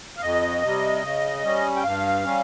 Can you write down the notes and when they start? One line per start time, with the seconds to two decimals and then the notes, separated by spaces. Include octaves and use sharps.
0.17 F5
0.22 F2 D#5
0.62 C3 G3
1.03 C#3
1.43 G3 C#4
1.76 G5
1.84 G2 F5
2.24 G3 C#4